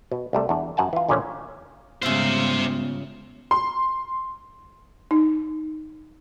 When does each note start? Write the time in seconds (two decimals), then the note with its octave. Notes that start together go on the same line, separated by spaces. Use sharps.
0.12 B2
0.33 C2 G3 A3
0.49 E2 D4
0.77 F#2 F#5 G#5 A5
0.93 E3 F4
1.09 D#2 A#2 D3 F3 C#4
2.03 G#2 C#3 G3 B3 F4 C5 E5
3.51 C6
5.11 D#4